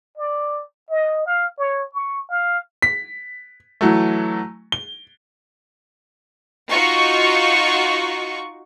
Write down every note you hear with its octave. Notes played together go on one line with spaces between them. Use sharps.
D5
D#5
F5
C#5
C#6
F5
B6
E3 F#3 A3
G7
D#4 F4 F#4 C#6